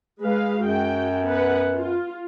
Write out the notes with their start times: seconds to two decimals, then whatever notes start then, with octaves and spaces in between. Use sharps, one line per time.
0.22 G#3 B4 F5
0.64 F#2 F#4 G5
1.25 B3 B4 F#5
1.75 F4